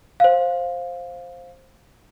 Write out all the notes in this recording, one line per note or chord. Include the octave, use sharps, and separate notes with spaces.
C5 F5